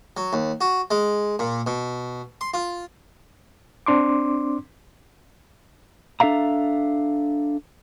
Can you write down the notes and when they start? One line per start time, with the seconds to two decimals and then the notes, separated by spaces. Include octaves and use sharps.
0.17 F#3
0.33 D#2
0.61 F#4
0.91 G#3
1.39 A#2
1.67 B2
2.41 C6
2.54 F4
3.86 C4 D4 C6 D6
6.20 D4 A4 E5 F5 A#5